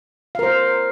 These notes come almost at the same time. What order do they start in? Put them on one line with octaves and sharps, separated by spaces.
F5 A#4 C5